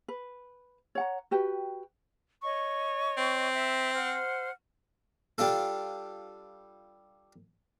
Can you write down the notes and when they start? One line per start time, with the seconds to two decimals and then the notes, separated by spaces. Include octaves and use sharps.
0.08 B4
0.95 C#5 F#5 A#5
1.31 F#4 G4 B4 G5
2.43 C#5 D#5 C#6
3.17 C4
3.53 E5
3.94 C5 F#5 F6
5.38 G3 D4 F4 A4